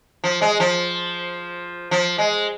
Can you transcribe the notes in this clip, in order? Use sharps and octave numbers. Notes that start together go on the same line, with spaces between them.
F3
G#3
F3
F3
G#3